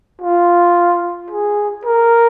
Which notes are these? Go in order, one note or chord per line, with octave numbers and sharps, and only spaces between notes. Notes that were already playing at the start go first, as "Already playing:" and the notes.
F4
G#4
A#4